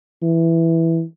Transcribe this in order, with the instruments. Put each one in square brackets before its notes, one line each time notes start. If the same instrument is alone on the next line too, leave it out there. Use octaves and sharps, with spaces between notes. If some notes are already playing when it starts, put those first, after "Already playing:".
[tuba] E3